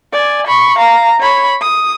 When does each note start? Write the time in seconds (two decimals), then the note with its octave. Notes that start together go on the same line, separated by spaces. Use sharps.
0.12 D5 G#5
0.47 B5 C#6
0.78 F5 A#5
1.20 C#5 B5
1.61 D#6